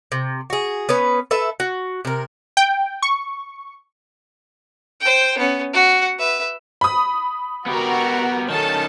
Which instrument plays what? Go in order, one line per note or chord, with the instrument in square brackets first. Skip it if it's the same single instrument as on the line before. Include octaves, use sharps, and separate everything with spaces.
[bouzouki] C3
F#4 G#4
B3 C#4 B4
A4 B4 E5
F#4
C3 A#4
[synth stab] G5
C#6
[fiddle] C5 G5
B3 C#4
F#4 F#5
B4 E5
[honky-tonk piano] B5 D#6
[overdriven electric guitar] B3 G4 [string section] F#4 A#4
[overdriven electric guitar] D#3 C#4 [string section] A4 A5